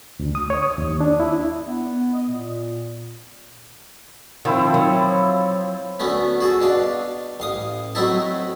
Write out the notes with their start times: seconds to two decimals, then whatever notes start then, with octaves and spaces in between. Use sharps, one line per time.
0.20 D2
0.35 D#6
0.50 C#5
0.62 D#6
0.78 D#2
1.01 D4
1.20 E4
1.67 B3
2.13 D#5
2.29 A#2
4.45 D#3 F3 C4 E4
4.74 F#3
6.00 D2 A3 B3 C#4
6.41 F#4 G#4 A4
6.61 B2 D4 F5
7.40 A1 F5 D#6
7.95 F#3 A3 C4 D#4 E4 A4